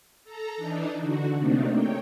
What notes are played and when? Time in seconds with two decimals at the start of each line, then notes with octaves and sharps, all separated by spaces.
0.24 A4 A#5
0.57 E3 D4 D#4
1.00 D3 F#4
1.37 C3 A3 A#3 C4 D4 D#4
1.69 C#5 G5